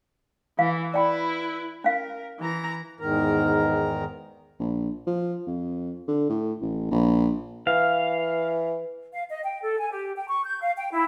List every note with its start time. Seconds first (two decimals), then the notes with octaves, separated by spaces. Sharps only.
0.59 E3 F5
0.94 E4 B4 D5 G5 B5
1.84 C#4 A#4 F5
2.40 E3 A#5
3.00 E2 G#2 D#3 A#4 A#5
4.60 A#1
5.07 F3
5.47 F2
6.08 D3
6.30 A2
6.61 A1
6.91 A#1
7.67 E3 F5
9.12 F5
9.28 D#5
9.43 G5
9.62 A4
9.79 G#5
9.91 G4
10.15 G5
10.28 C#6
10.44 G6
10.61 F5
10.76 G5
10.92 E4